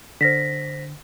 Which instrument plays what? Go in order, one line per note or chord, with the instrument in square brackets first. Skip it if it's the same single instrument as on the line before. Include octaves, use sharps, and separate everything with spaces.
[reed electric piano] D3 [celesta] C5 A#6 B6